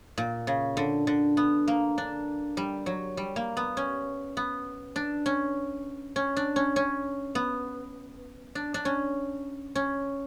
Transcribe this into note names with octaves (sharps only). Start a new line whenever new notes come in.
A#2
C#3
D3
D3
B3
A#3
D4
G3
F#3
G3
A#3
B3
C#4
B3
D4
C#4
C#4
D4
C#4
C#4
B3
D4
D4
C#4
C#4